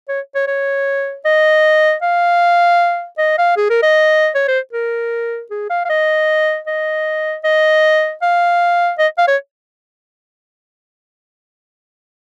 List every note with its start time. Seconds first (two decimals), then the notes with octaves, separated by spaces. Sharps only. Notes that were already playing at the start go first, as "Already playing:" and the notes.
0.09 C#5
0.35 C#5
0.47 C#5
1.25 D#5
2.02 F5
3.18 D#5
3.38 F5
3.57 G#4
3.70 A#4
3.83 D#5
4.35 C#5
4.48 C5
4.73 A#4
5.51 G#4
5.70 F5
5.85 F5
5.90 D#5
6.67 D#5
7.44 D#5
8.22 F5
8.99 D#5
9.18 F5
9.28 C#5